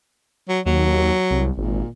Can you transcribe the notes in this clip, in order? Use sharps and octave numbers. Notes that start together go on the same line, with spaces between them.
F#3
D#2 F#3
C2
G#1 A#2